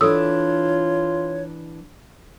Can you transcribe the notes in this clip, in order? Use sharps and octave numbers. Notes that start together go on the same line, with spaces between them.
E3 D4 F4 A4 C#5 D#6 E6